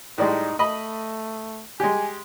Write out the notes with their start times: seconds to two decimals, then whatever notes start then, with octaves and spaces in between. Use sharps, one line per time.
0.18 A2 G3 G#3 D#4
0.59 A3 D#5 B5
1.80 G#3 G4 G#5